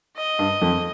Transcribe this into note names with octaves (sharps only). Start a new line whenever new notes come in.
D#5
G2
F2